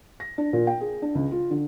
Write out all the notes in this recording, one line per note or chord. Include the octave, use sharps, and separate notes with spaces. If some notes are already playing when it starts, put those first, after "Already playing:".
A#6
D4
A#2
G5
G#4
D4
C#2
F4
D3